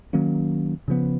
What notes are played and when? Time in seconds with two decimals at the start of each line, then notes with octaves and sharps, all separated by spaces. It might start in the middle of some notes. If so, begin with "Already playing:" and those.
0.13 D#3 F#3 A#3 C#4
0.88 C#3 F3 B3